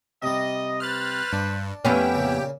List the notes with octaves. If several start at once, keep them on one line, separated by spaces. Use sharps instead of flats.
C3 G3 D#5
B4 C5 F6 F#6 A6
G2 D4
F2 B3 C#4 E4 G4 G5
A#2 C#3